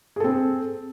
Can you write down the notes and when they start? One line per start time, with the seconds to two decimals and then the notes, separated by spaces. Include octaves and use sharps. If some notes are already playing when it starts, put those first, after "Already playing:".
0.16 G#4
0.20 A4
0.24 C4